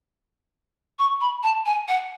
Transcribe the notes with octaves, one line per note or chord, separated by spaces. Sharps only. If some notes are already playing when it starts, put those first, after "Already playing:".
C#6
B5
A5
G#5
F#5